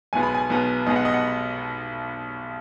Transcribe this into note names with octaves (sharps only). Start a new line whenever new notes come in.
B1 B2 G#3 B3 G#5
B5
G#5
B1 B2 G#3 B3
B1 B2 G#3 B3 D#5
F#5
D#5
F#5